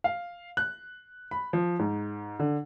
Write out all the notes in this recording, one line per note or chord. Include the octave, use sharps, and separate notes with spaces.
F5
F#6
B5
F3
G#2
D3